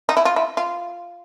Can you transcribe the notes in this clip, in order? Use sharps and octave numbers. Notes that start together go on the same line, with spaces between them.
D#4
E4
F4
E4
F4